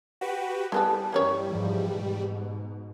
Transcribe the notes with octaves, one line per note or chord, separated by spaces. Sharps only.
F#4 G4 B4
E3 G3 B3 A4
G2 E3 A#3 C#4 C#5
E2 G#2 F3
G#2 B2